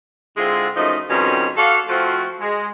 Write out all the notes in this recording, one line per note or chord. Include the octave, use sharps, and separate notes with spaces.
D3 G#3 C4 E4 F4
F#2 F3 A3 D#4 D#5
F2 B2 D#3 G3 C#4
F#4 A4 D5 F5
F3 A3 C4 F4 F#4
G#3